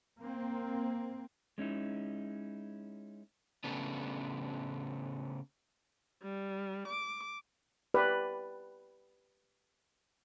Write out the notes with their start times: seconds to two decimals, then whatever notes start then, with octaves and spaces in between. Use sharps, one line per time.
0.22 A#3 C4
1.58 G#3 C#4 D#4 E4
3.64 C#3 A3 B3 D4
6.22 G3
6.88 D6
7.94 G4 B4 D5